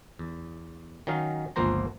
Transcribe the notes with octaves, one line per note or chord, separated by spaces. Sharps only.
E2
D#3 F#3 C#4 D#4 F5
G1 C#2 F3 A#3 C5 A#5